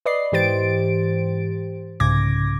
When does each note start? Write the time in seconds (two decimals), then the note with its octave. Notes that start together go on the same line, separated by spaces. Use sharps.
0.06 B4 D5 D#5 C7
0.32 G#2 E3 G4 C5 A6 D7
2.00 C2 G#2 C#3 D6 G#6 A#6